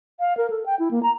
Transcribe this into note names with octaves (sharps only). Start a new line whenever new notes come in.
F5
A#4
A4
G5
E4
A#3
A#5